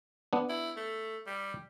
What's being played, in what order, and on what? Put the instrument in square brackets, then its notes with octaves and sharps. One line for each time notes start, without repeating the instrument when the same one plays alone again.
[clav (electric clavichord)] B3 D4
[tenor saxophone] E4
A3
G3